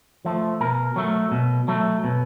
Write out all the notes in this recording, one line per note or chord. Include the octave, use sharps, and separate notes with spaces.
F3 A3
B2 A#4
F#3 A3
B2
F#3 A3
B2